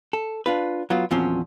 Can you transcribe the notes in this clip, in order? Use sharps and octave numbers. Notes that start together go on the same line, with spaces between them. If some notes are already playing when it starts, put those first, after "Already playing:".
A4
D4 F4 B4
F#3 B3 F4
E2 A#2 F3 F#3 C4 C#4